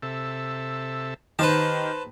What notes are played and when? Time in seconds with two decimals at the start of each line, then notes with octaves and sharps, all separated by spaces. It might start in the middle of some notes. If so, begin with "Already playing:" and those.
0.02 C3 A4 E5
1.39 D#3 G4 B4 C5 A5